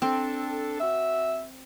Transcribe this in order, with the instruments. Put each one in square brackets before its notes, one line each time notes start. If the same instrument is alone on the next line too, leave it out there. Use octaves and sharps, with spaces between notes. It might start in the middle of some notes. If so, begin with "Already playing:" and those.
[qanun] C4 [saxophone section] D4 A4
[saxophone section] F#4 E5